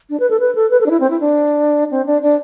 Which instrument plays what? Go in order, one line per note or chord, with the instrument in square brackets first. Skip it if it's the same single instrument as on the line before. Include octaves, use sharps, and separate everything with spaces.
[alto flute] D4
B4
A4
B4
A4
B4
A4
D4
E4
C4
E4
D4
C4
D4
D4